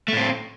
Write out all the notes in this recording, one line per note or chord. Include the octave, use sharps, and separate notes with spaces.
A2 A3 C4